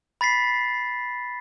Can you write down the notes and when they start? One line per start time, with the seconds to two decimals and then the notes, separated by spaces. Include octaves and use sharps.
0.21 B5 A6 B6 C7